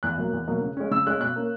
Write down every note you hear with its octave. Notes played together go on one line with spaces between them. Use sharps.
E2 F#6
B2 F#3 A#3
E2
B2 F#3 A#3
C#3
G#3 C#4
C#3 E6
G#3 C#4 F#6
B2 F#6
A#3 C#4